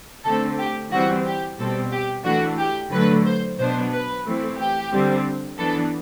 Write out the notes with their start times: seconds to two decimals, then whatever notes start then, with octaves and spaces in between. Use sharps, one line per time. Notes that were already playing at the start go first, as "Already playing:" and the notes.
0.24 D3 A3 C4 A4
0.59 G4
0.92 E3 G3 C4 F#4
1.25 G4
1.58 B2 G3 C4 A4
1.92 G4
2.24 E3 A3 D4 F#4
2.58 G4
2.92 D3 F#3 A3 B4
3.25 C5
3.58 B2 F#3 B3 D4 C5
3.92 B4
4.25 E3 A3 C4
4.57 G4
4.92 D3 G3 C4
5.57 E3 B3 D4 A4